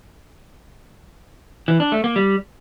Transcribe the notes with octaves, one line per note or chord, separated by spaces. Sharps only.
E3
D4
A3
A#3
G3